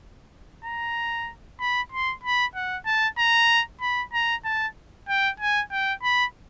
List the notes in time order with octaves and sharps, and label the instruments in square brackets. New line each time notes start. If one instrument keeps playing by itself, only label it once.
[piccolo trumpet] A#5
B5
C6
B5
F#5
A5
A#5
B5
A#5
A5
G5
G#5
G5
B5